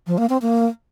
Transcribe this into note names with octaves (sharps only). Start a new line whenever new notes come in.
F3
A#3
C4
A#3